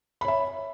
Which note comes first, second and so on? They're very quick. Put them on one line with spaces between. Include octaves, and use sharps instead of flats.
B5 C#5 E5